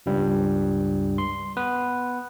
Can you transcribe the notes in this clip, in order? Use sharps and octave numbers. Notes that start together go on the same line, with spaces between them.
C#2 G2 G3
C6
B3 B4